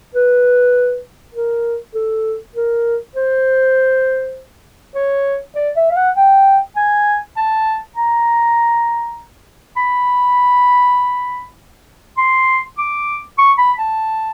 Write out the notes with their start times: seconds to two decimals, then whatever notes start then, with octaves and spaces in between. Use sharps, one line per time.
0.15 B4
1.35 A#4
1.95 A4
2.55 A#4
3.16 C5
4.95 C#5
5.55 D5
5.76 E5
5.91 F5
5.97 F#5
6.17 G5
6.76 G#5
7.37 A5
7.96 A#5
9.77 B5
12.18 C6
12.78 D6
13.38 C#6
13.58 B5
13.79 A5